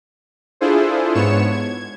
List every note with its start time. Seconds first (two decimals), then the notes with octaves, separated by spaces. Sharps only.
0.61 D4 E4 F4 G#4 A4 C5
1.15 G#2 B3 C#5 C#7 E7
1.51 G#6